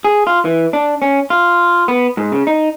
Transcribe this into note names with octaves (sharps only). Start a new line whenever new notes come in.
G#4
F4
E3
D4
C#4
F4
B3
G#2
C#3
D#4